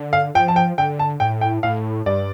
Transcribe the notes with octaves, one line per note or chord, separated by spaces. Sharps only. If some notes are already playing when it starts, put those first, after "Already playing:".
Already playing: D3
F5
F3 G5
A5
G5
D3 G5
A5
A2 G5
G5
A2 F5
G2 D5